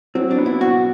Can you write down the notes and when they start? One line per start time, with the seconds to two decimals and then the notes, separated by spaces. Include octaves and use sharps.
0.15 F#3 C4
0.31 D4
0.38 B3
0.46 E4
0.61 B2 F#4